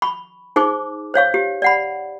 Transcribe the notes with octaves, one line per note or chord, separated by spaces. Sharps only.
B5 C#6
D#4 G#4 C5 C#6 D6
C5 C#5 F5 C#6
G4
D5 F#5 B5